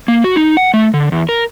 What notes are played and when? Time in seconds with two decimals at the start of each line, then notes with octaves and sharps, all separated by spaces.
0.08 A#3
0.24 F#4
0.36 D#4
0.57 F#5
0.74 A3
0.94 D3
1.12 E2
1.29 A#4